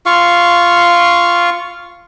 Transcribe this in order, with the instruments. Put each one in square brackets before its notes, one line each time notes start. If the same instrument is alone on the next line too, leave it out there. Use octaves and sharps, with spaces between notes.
[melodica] F4 F5 C#6